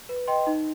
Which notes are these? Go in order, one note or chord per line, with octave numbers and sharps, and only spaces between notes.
B4
D#5 G5 C6
D#4